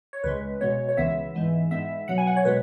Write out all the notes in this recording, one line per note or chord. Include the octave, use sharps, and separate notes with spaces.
C#5
C#2 C#3 G#3 B4
B2 G#3 B3 C#5
C#5
C#2 C#3 E3 B3 E5
G#2 E3 G#3 B3
G#2 G#3 B3 E5
B2 F#3 B3 F#5
G#5
F#5
C#5
B2 G#3 B3 B4